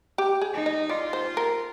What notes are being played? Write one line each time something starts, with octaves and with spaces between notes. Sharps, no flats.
G4
G#4
D#4
D#5
F4 D5
C5
A#4